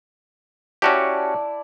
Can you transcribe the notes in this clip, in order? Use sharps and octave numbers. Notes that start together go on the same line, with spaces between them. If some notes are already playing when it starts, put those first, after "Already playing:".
C#4 E4 F#4 G4 D5 A5